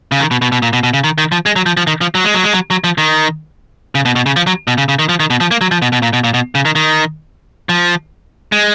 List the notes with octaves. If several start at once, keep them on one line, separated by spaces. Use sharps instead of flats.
C#3
D#3
B2
B2
B2
A#2
B2
B2
C#3
D#3
D#3
F3
G#3
F#3
F3
F3
D#3
F3
F#3
G#3
F#3
G#3
F#3
F#3
F3
D#3
C#3
B2
B2
C#3
F3
F#3
B2
C#3
C#3
D#3
F3
D#3
B2
F3
A#3
F#3
F3
B2
B2
A#2
B2
A#2
B2
C#3
D#3
D#3
F3
G#3